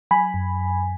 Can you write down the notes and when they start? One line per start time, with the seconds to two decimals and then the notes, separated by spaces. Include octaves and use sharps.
0.11 F#3 G#5 B5
0.34 F#2